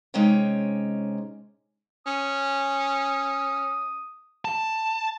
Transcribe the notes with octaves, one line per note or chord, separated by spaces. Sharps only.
C3 G#3 C#4 D#4 C#5 G5
C#4 D#6
A5